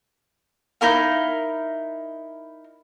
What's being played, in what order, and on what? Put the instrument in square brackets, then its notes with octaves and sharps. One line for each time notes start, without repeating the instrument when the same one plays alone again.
[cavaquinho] D#4 E4 A#4 F5